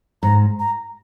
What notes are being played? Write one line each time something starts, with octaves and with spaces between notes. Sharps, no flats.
G#2 A#5
A#5